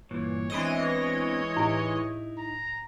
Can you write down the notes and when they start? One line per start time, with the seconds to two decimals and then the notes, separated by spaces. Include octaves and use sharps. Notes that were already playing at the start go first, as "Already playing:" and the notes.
0.11 G2 A#2 E3 C#5
0.50 E3 G#3 B3 C4 D4 D#5
1.57 A2 D#4 E4
2.38 A#5